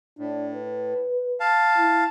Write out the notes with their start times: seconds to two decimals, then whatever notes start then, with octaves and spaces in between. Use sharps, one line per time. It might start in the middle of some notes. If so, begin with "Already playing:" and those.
0.19 A2 D4
0.54 B4
1.40 F5 A5
1.78 E4